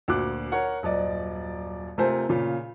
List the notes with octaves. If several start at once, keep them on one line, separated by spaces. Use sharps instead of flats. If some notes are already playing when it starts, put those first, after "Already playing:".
D2 A#2 F#4 D6 F#6
A#4 C#5 F#5
D#1 F#2 D5 D#5
C3 A3 F4 A#4 C5 G#5
A#2 C#3 F4